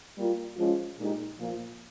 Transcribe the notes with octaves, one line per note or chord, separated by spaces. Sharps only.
G3 A#3 F4
F3 G#3 C#4 F4
A#2 G#3 D#4 G4
A#2 F3 A#3 F4